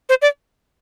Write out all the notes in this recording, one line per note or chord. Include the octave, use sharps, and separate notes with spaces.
C5
D5